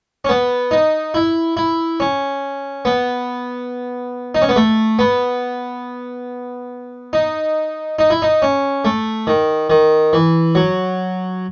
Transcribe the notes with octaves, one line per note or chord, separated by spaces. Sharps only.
C#4
B3
D#4
E4
E4
C#4
B3
D#4
C#4
B3
A3
B3
D#4
D#4
E4
D#4
C#4
A3
D#3
D#3
E3
F#3